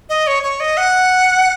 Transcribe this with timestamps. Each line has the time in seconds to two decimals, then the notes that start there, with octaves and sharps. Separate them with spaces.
0.09 D#5
0.27 C#5
0.43 C#5
0.60 D#5
0.77 F#5